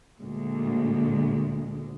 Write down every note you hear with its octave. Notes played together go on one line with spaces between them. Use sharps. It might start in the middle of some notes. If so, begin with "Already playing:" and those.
D2 A#2 G#3